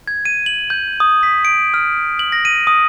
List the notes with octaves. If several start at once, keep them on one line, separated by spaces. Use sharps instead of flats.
G#6
D#7
F#7
G6
D#6
B6
D7
F6
F#7
A#6
D#7
D#6